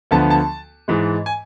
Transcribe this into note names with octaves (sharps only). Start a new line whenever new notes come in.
D2 D3 F3 B3 A5
A5
G#2 E3 G#3
G#5